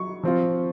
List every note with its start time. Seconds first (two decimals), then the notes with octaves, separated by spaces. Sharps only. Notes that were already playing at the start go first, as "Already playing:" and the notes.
Already playing: F#3 C#6
0.23 F3 C4 F4